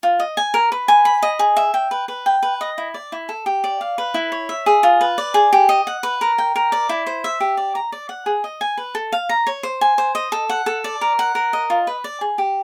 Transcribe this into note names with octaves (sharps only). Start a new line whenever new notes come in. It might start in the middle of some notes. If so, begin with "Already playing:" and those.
F4
D#5
G#5
A#4
B4
G#5
B5
D#5
G#4
E5
G5
B4
B4
G5
B4
D#5
E4
D5
E4
A4
G4
D5
F5
B4
E4
C#5
E5
G#4
F4
B4
D5
G#4
G4
D#5
F#5
B4
A#4
G5
A#4
D5
E4
C5
E5
G4
D5
A#5
D5
F#5
G#4
D#5
G#5
B4
A4
F5
A#5
C#5
C5
G#5
C5
D#5
A4
F#5
A4
D5
A#4
F#5
A#4
D#5
F4
B4
D5
G#4
G4